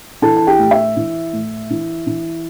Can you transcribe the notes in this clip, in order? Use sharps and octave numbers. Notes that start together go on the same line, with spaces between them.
E3 A4 A5
A5
G4 G5
A2
E5
E3
A2
E3
E3